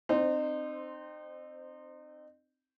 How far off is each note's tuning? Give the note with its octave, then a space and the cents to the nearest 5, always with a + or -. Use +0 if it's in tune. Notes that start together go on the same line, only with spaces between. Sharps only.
C4 +0 D#4 -35 C5 -15